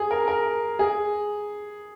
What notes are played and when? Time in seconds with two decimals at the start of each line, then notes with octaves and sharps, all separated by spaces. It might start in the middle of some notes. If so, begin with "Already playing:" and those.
Already playing: G#4
0.11 A#4
0.28 A#4
0.79 G#4